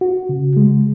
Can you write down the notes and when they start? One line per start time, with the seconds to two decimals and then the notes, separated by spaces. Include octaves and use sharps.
0.01 F#4
0.29 C#3
0.56 G#3